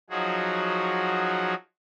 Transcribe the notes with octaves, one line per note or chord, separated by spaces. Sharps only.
F3 F#3 D#4 F#4 G#4